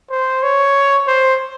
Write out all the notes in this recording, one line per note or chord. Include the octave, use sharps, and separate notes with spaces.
C5
C#5
C5